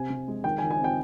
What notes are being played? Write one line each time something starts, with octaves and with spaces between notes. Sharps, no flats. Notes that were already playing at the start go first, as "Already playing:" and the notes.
Already playing: C3 G#5
C3
G#3
D#3 G5
G#5
D#3
G#5
C4 G5